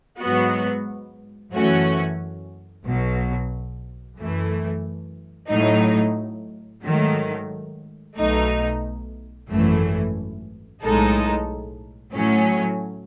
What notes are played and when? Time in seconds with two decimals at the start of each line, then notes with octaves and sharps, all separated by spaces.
0.20 G#2 F#3 B3 F#4
1.53 F#2 E3 A3 C#4 F#4
2.86 B1 B2 F#3
4.18 F#2 E3 A3
5.51 A2 F#3 A3 D#4
6.84 G#2 D#3 F#3 A3
8.17 B1 B2 A3 D#4
9.49 G#1 F#2 E3 A3
10.82 B1 A2 G#3 D#4 A4
12.15 A2 F#3 A3 C#4